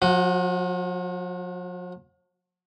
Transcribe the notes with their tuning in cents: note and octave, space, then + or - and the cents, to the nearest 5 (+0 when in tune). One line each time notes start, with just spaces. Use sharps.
F3 +45 F#4 +0